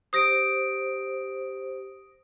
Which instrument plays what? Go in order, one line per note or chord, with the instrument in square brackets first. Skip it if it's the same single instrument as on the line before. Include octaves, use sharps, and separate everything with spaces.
[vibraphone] G4 C5 [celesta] D#6 A#6 D7